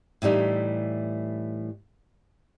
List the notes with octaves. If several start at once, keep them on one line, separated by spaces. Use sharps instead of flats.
A2 E3 G3 D#4